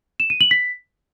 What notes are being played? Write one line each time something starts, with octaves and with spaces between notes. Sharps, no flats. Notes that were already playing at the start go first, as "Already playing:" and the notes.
E7
D#7
F#7
B6